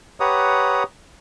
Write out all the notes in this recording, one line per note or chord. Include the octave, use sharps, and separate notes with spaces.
G4 B4 C#5 F#5 A#5 D#6